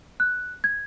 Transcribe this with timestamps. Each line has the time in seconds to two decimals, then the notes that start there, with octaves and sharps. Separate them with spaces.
0.20 F#6
0.64 G#6